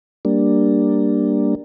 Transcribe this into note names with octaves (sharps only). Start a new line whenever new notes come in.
G3 A#3 D4